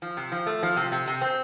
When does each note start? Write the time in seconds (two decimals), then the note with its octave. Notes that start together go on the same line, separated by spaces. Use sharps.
0.02 F3
0.17 C3
0.32 F3
0.46 A3
0.63 F3
0.76 C3
0.92 C3
1.08 C3
1.21 C4